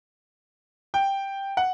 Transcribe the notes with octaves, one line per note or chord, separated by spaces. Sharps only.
G5
F#5